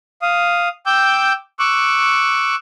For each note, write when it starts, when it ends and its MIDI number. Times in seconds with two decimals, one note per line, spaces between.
0.22 0.68 77
0.22 0.68 87
0.86 1.33 79
0.86 1.33 86
0.86 1.33 88
0.86 1.33 91
1.59 2.55 85
1.59 2.55 86
1.59 2.55 88
1.59 2.55 90